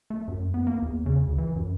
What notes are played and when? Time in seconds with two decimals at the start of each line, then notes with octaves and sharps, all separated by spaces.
0.10 A3
0.28 F#2
0.54 B3
0.67 A#3
0.82 E2
1.06 C#3
1.27 D2
1.38 E3
1.55 F#2